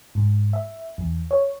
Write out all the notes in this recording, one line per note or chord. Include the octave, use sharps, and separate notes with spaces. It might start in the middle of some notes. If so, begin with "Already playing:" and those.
G#2
E5
E2
C#5